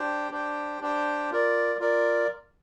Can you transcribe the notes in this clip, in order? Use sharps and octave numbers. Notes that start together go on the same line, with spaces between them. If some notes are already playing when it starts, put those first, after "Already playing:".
Already playing: D4 G4 C5 G5
D4 G4 C5 G5
D4 G4 C5 G5
F4 A#4 D5
F4 A#4 D5